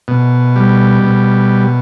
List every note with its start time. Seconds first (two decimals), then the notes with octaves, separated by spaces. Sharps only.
0.08 B2
0.56 G3
1.03 B2